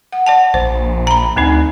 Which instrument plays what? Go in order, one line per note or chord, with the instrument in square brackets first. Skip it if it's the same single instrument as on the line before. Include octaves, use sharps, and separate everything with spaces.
[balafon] F#5
D5 F#5 A5
[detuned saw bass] A#1 [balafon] C5
[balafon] A#5 B5
[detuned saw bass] D2 [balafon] A3 C4 D#4